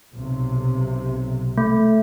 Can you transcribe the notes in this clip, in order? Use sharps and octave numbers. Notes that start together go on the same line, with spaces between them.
B1 C3
A3